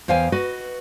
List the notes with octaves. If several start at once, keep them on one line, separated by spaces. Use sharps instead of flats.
E2 C5 F5 G5 G#5
F#4 B4 D#5